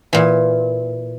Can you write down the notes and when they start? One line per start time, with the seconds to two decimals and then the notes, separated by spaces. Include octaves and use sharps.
0.13 A#2 E3